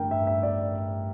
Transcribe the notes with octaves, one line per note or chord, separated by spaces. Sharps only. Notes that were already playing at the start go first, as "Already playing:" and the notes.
Already playing: A1 G2 D3 A#4 G5
E5
E5
D5